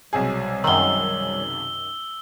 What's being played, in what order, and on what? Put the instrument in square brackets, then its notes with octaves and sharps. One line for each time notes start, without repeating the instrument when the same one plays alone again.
[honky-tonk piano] B1 C3 G#4 [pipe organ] G3 C#5
[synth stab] F#2 D#3 [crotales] E6 G7